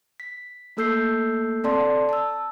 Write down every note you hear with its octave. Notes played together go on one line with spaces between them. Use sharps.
B6
A3 A#3 A4 E6 G6 C7
C4 A4 D5 A5 C6
A5 E6